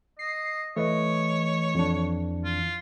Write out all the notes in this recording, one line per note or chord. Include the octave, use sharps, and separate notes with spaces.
D#5 C7
E3 A3 B4 C#5 D#5
F2 D4
F4